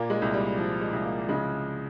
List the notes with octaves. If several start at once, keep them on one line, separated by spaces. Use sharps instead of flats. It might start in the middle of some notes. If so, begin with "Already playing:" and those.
Already playing: A#2 A#3
G#3
C2
G3
F3
G#3
C2
A#3
C#3 G#3